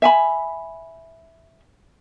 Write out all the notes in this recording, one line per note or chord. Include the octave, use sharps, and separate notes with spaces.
E5 G#5 B5